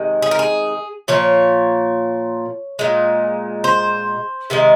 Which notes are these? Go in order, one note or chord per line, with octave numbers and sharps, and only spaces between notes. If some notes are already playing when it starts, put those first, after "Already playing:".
Already playing: C3 D#3 G#3
G#4
A#4
G#4
A#2 F3 C#5
A#2 G#3
C5
C3 D#3 G#3